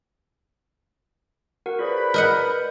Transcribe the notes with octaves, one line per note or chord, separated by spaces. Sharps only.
F#4 A#4 F#5
F4 G#4 B4 C5 D5 B5
A#4 D#5 F#5 G6